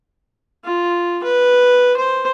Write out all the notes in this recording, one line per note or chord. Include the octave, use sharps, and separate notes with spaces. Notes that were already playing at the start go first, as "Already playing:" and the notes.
F4
B4
C5